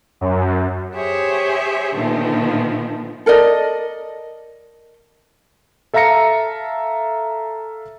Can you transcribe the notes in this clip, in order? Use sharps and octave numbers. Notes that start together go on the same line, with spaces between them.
F#2
G4 G#4 C5 C#5 E5
A#2 D3 D#3 F3 A3 B3
A4 A#4 D5 D#5
A4 E5 F5 A#5 A#6 C#7